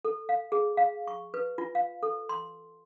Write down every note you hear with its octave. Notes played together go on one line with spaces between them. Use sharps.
A4
F5
G#4
F5
C#6
B4
F4
F5
A4
C6